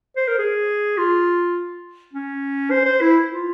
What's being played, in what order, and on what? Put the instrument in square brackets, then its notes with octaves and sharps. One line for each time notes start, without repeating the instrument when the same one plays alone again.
[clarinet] C5
A#4
G#4
F4
C#4
C5
C5
E4
F4